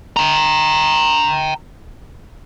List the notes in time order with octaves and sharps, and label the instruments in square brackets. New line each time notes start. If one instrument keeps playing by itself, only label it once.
[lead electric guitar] G5 A#5